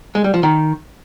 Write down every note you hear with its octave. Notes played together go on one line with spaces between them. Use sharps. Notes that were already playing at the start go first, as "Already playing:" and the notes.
G#3
G3
F3
D#3